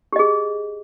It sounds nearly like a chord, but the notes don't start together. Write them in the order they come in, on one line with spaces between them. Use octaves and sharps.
G4 D#5 G#4